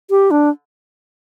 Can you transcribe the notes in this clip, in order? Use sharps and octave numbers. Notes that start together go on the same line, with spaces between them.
G4
D4